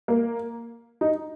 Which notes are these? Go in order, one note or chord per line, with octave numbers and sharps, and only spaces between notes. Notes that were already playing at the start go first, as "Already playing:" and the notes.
A#3
D#4